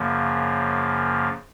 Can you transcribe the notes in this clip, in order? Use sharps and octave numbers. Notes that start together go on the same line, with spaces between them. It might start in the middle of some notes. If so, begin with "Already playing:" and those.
Already playing: F#2 C#3 F3 A#3